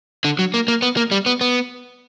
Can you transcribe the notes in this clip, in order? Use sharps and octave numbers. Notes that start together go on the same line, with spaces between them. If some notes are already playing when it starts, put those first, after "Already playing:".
D3
F#3
A#3
A#3
B3
A#3
G3
B3
B3